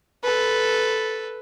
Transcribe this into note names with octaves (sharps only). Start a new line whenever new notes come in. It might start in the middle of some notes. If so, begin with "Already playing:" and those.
A4 B4